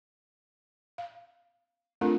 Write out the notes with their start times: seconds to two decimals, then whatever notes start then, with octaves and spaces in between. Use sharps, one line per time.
0.98 F5
2.01 A3 C4 D4 F4 A4 A#4